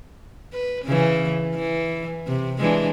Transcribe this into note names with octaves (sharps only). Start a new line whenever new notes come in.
B4
C#3 E3
E3
C3
E3 G#3 D4